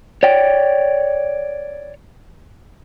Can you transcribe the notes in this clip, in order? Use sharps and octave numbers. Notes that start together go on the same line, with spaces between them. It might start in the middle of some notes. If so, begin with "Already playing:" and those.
C#5 D5 G5